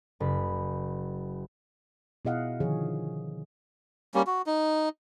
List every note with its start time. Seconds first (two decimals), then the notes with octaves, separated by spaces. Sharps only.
0.20 F#1 B5
2.25 B2 E4 G#4 D#5 F5 F#5
2.60 D3 D#3 F3 G#4 C#5
4.14 G3 A#3 C#4
4.27 F#4
4.46 D#4